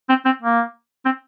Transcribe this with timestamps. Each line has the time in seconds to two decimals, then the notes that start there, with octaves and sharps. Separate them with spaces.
0.09 C4
0.25 C4
0.42 A#3
1.05 C4